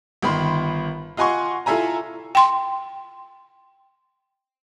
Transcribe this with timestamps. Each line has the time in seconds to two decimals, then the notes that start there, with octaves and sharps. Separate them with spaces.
0.22 G1 D#3 B5 C6
1.17 F4 D#5 F#5 G#5 C6 C#6
1.66 E4 F4 A4 E5 G#5 A#5
2.35 G5 C6